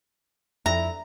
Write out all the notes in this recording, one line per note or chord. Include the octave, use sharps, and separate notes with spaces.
F2 E4 A#5